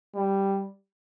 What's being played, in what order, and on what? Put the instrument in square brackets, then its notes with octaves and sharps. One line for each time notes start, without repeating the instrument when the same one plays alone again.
[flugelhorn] G3